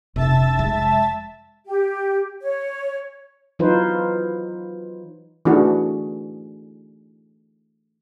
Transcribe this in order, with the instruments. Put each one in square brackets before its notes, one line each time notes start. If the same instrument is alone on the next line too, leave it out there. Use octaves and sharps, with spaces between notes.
[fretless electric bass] F1 [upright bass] C3 C#4 [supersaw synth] E5 A5 A6
[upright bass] G#3
[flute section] G4
C#5
[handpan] E3 F#3 D#4 F4 B4 C5
[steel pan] E3 A3 D4 D#4 F#4 G#4